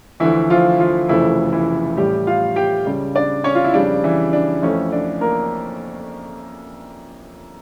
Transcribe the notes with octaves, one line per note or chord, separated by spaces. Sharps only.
D2 D3 E3 F3 E4
F3 F4
F3 F4
F1 F2 C#3 E3 F3 A3 E4
E3 E4
A1 A2 G3 G4
F4 F5
G4 G5
C#2 C#3 G3
D4 D5
C#4 C#5
F4
E4
F2 C#3 G3 D4
E3 E4
D4
F2 E3 A3 C#4
D4
A#3 A#4